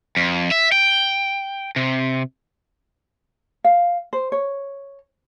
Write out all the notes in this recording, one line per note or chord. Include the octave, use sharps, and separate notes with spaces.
F2
E5
G5
C3
F5
C5
C#5